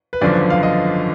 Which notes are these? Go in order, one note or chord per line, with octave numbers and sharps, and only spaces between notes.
B4
G#1 F#2 D3 F3 B3 D5
F5
D#5